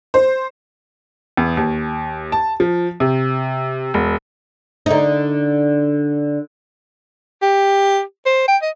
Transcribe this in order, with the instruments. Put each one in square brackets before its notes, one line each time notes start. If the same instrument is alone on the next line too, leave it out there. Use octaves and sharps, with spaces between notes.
[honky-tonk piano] C5
[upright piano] E2
D#2
A5
F3
C3
E1
[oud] D3 D#4
[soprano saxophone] G4
C5
G5
D#5